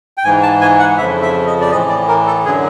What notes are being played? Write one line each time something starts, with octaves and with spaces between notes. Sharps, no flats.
G5
G#2 E3 G#5
A5
G#5
F#5
F2 C#3 F3 E5
E5
D#5
D5
A2 E3 D#5
D5
A#4
A4
F#2 D3 F#3 G#4